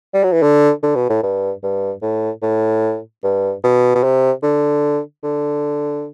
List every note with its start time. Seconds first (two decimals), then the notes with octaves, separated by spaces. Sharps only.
0.14 G3
0.24 F#3
0.32 E3
0.42 D3
0.83 D3
0.95 B2
1.10 A2
1.23 G2
1.63 G2
2.02 A2
2.42 A2
3.24 G2
3.63 B2
3.95 B2
4.03 C3
4.43 D3
5.23 D3